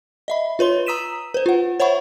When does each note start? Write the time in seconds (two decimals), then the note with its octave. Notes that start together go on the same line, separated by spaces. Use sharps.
0.28 D#5 E5 B5
0.59 F4 B4 C#5 C6 G7
0.86 A#5 D#6 E6 B6 D#7 E7
1.34 B4 C5
1.46 F4 F#5
1.80 C5 C#5 E5 F#5 B5 C#6